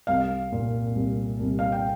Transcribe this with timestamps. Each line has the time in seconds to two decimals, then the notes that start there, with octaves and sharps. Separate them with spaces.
0.07 C2 F5
0.52 A#2
0.95 C2
1.40 C2
1.59 F5
1.72 G5